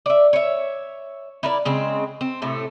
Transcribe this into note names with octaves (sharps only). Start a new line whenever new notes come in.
D5 E5
C#5 E5
E4 A#4 D5
C#3 G#3 C4
C4
A2 C3 A3